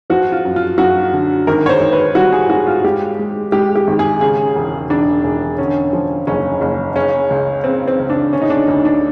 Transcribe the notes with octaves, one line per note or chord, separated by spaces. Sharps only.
F3 F#4
F4
F#2
F4
F#2 F#4
D3
G#1 A#4
C#5
C5
G#1
B4
G3 F#4
G#4
G#2 F#4
F4
G#3 G4
G#3
G#3 G4
G4
G#1
G#4
C#3 G#4
E1
E1 D4
E1
D3 C#4
F3
F#1 C#4
F#1
C#3 C#4
C#2
C#3 C4
C4
C#2
D4
D3 C#4
D#4
D4
D2 D#4
D4